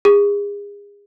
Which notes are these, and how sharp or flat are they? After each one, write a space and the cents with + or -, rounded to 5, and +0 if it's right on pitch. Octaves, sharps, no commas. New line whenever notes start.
G#4 -35